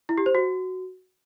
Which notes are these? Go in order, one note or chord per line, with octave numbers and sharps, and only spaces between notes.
E4
G4
C5
F#4